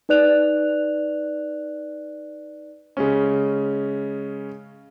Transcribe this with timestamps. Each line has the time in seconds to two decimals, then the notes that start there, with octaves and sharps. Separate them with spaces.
0.09 D#4 B4 D5 F#6 F7
2.97 C#3 G#3 C#4